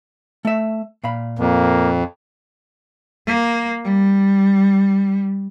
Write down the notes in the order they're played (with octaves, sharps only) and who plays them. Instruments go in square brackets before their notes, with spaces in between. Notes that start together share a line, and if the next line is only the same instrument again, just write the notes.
[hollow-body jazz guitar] A3 E5
A#2 F5 B5
[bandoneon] F2 [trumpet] A#3
[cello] A#3
G3